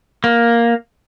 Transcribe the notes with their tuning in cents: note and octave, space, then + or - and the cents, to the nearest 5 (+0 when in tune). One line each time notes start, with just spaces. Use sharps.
A#3 +5